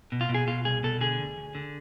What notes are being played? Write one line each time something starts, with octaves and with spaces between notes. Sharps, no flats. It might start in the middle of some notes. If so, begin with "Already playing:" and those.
B2
F4
B2
G#4
B2 F4
C2 G#4
B2 A4
D3 G#4
D2
D2
D3